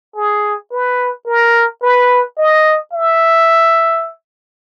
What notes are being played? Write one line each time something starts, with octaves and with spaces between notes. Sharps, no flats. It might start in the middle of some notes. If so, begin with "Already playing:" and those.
G#4
B4
A#4
B4
D#5
E5